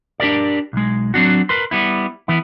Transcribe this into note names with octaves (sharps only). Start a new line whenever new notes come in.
D4 G4 A#4 D5
B1 G#3
F#3 C4 D4 F#4
A#4 B4 C6
G3 B3 E4
E3 B3 E4